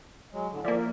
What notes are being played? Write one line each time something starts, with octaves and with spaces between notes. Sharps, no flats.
F#3 G#3
A2 D3
F3 A#3 D5 E5
A#4